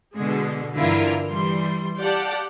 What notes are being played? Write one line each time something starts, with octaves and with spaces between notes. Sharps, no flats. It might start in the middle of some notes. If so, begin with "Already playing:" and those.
B2 D3 G#3
G2 D3 E3 E4 F4 A#4
E3 G3 C6
G4 D5 F5 F#5 A5